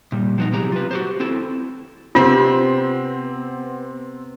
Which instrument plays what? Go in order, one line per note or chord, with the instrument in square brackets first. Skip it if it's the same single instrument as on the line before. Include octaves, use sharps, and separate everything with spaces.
[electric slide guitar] A#2 G3
F3 B3 D#4
C3 E3 F#3 G4 G#4 A#5
F4 B4
F#4 G4 C5
C4 E4 A4
[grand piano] C3 C4 [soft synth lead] B3 [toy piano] F4